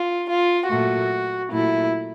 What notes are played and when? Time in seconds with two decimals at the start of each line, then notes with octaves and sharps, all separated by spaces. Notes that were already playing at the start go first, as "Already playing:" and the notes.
Already playing: F4
0.30 F4
0.70 A#2 F#3 A3 F#4
1.50 A#2 F#3 A3 E4